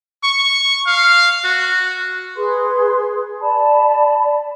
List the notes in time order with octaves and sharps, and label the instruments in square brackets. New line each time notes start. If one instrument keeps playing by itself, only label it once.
[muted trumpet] C#6
F5
F#4
[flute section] G#4 B4 C6
D5 A5 B5